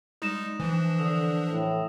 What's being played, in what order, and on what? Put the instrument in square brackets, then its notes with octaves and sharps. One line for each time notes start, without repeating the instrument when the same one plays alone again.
[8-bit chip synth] G3 G#3 D#4 [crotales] D#6 A#6 E7
[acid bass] E3 [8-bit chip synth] F3 D4
[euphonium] D3 [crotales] D#6 E6
[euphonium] A2